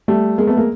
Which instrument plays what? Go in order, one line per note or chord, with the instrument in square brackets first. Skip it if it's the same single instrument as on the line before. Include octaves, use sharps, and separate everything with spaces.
[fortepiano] G3 A3
G#3 A#3
A3 B3
G#3 A#3